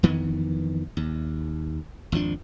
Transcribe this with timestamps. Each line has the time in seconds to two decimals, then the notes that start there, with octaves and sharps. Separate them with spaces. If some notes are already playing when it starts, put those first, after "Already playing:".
0.03 F2 D#3 E3 B3
0.97 D#2
2.12 G#1 F2 F3 D4